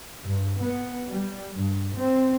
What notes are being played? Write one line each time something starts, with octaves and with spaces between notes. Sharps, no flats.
G2
B3
G3
G2
C4